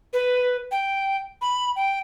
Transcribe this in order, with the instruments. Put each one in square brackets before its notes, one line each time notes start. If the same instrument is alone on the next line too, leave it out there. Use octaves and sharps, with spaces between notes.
[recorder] B4
G5
B5
G5